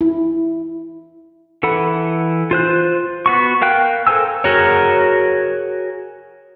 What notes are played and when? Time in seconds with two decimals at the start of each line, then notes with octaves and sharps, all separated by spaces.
0.01 E4
1.63 E3 A4 F#5 B5
2.51 F4 C5 F#6
3.26 B3 F#4 C#6
3.61 A#4 F5 G5 F#6
4.07 A4 A#4 C5 G#5 E6
4.44 F#4 G#4 A#4 C#5